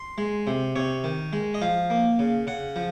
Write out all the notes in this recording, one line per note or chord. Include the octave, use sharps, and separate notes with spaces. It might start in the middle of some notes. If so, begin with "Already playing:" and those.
Already playing: C6
G#3
C3
C3 C#5
D#3
G#3
D#5
F3 F5
A#3
C#3
C#3 F#5
F3